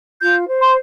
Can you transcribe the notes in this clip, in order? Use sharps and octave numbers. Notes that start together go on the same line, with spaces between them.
F4 G6
C5
C6